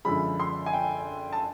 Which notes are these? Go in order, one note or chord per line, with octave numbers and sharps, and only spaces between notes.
F#2 D3 F3 G#3 B5
C6
G#5
G5
A5